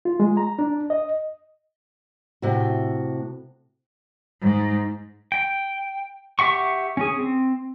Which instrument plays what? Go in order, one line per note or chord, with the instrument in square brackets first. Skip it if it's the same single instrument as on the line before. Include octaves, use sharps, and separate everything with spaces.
[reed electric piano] F4
G#3
A#5
D4
D#5
[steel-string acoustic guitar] A2 C3 F#4
[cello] G#2
[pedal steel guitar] G5
G4 E5 F#5 C#6
C#4 G#4
C4